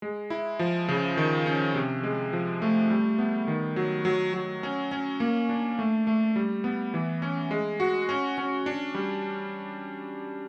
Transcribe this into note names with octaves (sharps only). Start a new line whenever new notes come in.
G#3
E4
F3
C#3
D#3
C#4
C3
G#3
F3
A3
G3
B3
D#3
F#3
F#3
F#3
C#4
C#4
A#3
D4
A3
A3
G3
B3
E3
C#4
G#3
F#4
C#4
C#4
D4
G3